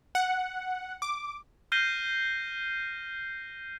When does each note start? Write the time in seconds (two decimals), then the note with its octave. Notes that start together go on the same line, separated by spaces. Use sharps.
0.15 F#5
1.02 D6
1.72 F6 G6 A#6 C7 D#7 G7